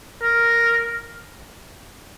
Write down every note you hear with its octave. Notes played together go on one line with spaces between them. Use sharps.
A#4